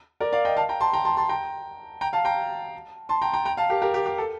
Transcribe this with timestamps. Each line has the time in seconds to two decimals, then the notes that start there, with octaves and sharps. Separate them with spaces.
0.20 A#4 D5
0.32 D5 F5
0.45 D#5 G5
0.57 F5 A5
0.69 G5 A#5
0.81 A5 C6
0.93 G5 A#5
1.05 A5 C6
1.17 A5 C6
1.29 G5 A#5
2.01 G5 A#5
2.13 F5 A5
2.25 G5 A#5
3.09 A5 C6
3.22 G5 A#5
3.33 G5 A#5
3.45 G5 A#5
3.57 F5 A5
3.70 G4 A#4
3.82 G4 A#4
3.94 G4
4.06 G4
4.18 A4